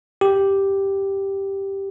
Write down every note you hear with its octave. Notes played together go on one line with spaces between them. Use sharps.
G4